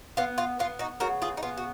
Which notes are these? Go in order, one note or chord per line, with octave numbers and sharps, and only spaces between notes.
B3 F4
F4
B3 F4
D#4 F#4
C#3 F#4 A#4
F4 G#4
D#4
B3 F4
F#4